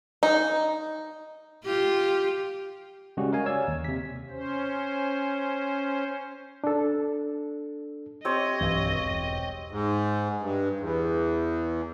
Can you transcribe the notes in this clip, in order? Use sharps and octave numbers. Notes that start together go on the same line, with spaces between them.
D#4
F4 G4
C#3 G3 G#3 C#4 F#4 G4
A#4 D#5 F5 G#5
C#5 D5 E6 G#6
D#2
C3 B6
C#4 C5
D4 A4
C4 G4 C#5 D#5
B1 G2 E3
E1
G#2
G2
E2